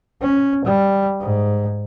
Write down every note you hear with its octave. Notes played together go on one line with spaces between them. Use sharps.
C#4
G3
G#2